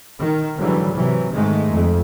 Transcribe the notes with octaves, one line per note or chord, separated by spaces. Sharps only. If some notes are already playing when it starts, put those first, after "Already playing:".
D#3
G#2 D3 E3 F#3 G3
C3 E3 F#3
G#2 D#3 G#3 A3
F2